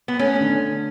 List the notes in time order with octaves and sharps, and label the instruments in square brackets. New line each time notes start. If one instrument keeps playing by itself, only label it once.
[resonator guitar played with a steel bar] B3
[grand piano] A3 [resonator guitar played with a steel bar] C#4
[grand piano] D3